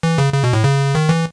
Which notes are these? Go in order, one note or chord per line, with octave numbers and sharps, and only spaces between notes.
E3
C#3
C#3
B2
A2
C#3
D#3
E3